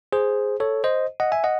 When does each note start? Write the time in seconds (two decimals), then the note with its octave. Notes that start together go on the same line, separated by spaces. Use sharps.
0.13 G#4 C5
0.60 A4 C#5
0.84 C5 D#5
1.20 D#5 F#5
1.32 E5 G#5
1.44 D#5 F#5